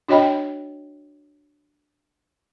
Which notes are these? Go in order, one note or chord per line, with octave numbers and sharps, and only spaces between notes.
D4 F#4 C#5 D#5 G5 B5